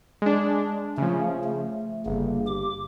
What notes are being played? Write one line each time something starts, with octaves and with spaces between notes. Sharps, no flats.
G#3 D4
C#3 F3 A3 C#4
A3
G1 C#3 A#3
G4 D6